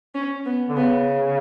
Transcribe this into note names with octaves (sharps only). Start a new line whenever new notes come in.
C#4
B3
D3
C#3 B3